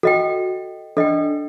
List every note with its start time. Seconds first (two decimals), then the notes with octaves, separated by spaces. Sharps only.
0.03 F#4 A4 D#5 G5
0.97 D4 A4 D#5 G5